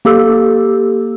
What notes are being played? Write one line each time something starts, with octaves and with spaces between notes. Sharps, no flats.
A#3 G4 A4 E6